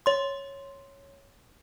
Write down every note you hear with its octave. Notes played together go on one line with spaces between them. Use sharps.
C#5 C6